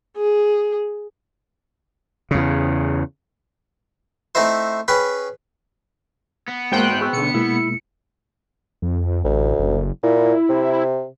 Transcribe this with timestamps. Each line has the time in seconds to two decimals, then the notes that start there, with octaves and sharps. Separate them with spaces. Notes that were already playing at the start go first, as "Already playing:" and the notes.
0.17 G#4
2.31 E2 C#3
4.35 A3 C4 D#4 E4 C5
4.88 C#4 G#4 B4 G5 B5
6.49 B3
6.72 G#2 G#3 A#3 F#4 C5 G5 F#6
7.01 G#4 C#6 E6
7.13 B2 D3 C#7
7.34 B2 G#3 A#3 E4
8.82 F2
9.24 A1 D2
9.59 F#1
10.03 A#2 E4
10.49 C3